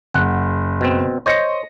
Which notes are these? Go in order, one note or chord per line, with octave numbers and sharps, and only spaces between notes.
F#1 F#5
B2 C4
C5 C#5 D#5 A#6 C#7